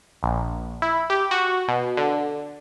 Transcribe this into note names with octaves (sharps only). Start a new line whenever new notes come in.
A#1
E4
G4
F#4
B2
D3